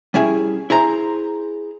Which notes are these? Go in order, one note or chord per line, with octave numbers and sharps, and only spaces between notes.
G3 C#4 E4 G#4
E4 G#4 C5 A#5